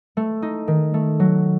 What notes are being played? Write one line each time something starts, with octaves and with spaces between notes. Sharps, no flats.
A3
D#4
D#3
A3
F#3